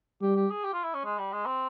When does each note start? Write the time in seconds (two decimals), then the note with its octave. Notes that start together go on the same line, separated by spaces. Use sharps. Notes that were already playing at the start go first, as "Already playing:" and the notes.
0.22 G3 G4
0.36 G4
0.50 G#4
0.64 G4
0.74 F4
0.84 E4
0.94 C#4
1.05 G#3
1.18 G3
1.32 G#3
1.46 C4